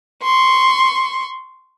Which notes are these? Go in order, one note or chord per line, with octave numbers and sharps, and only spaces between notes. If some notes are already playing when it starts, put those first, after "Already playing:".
C6 C#6